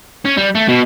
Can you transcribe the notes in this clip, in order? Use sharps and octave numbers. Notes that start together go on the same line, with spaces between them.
C#4
G3
A3
B2